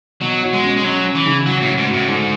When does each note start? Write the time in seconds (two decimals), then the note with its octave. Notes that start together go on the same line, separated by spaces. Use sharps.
0.21 B2 F#3
0.43 F#4
0.53 G#3
0.63 C#4
0.77 G#3
0.83 F#3 C#4
1.05 C#4
1.15 E3
1.26 C#3
1.46 F#3 F#4
1.62 A2 F#4
1.78 G#2
1.88 F#4
1.94 A2
2.08 G#2 D3